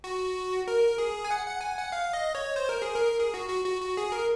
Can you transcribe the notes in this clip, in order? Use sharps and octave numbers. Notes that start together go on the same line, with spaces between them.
F#4
A#4
G#4
G#5
F#5
F#5
G#5
F#5
F5
D#5
C#5
C5
A#4
G#4
A#4
G#4
F#4
F#4
F#4
F#4
G#4
A#4